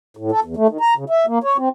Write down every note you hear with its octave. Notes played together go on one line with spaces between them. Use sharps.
A2
A4
E2
A3
D#3
A#5
C#3
E5
A#3
C#5
C4